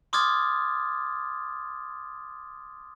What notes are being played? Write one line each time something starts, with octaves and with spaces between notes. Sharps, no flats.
C6 D6 D#6 F6 G#6 A6